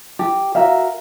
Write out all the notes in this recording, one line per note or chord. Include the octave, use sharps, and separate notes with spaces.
G4
F#4 A#4 E5 F5